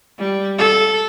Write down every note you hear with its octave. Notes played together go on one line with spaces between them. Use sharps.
G3
A4